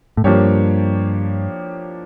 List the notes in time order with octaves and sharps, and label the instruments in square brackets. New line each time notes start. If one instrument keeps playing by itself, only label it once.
[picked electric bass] A2
[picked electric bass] G2 [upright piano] F3 A#3 D4 G4 C#5